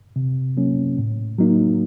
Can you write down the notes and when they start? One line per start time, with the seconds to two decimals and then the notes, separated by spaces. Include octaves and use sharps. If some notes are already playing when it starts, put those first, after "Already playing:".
0.16 C3
0.57 F#3 A#3 C#4
0.98 A2
1.39 F#3 A#3 D#4